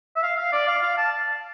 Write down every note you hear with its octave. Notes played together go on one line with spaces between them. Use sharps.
E5
F5
F5
D5
F5
F5
A5